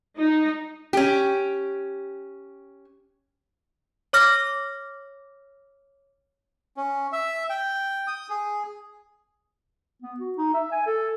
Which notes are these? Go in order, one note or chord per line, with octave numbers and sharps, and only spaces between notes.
D#4
C#4 G4
C#5 D6 F6 A#6
C#4
E5
G5
D#6
G#4
B3
F#4
D#4
E5
G#5
A4